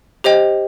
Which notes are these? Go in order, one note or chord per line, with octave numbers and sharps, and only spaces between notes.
G4 C5 D#5 G5